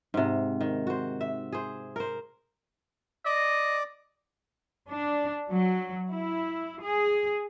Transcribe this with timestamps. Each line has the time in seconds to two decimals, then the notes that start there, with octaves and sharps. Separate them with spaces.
0.14 G#2 C3
0.61 D#3
0.87 F#4 C5
1.21 E5
1.52 G#4 C5
1.96 A#4 C5
3.25 D5 D#5
4.88 D4
5.50 F#3
6.09 E4
6.81 G#4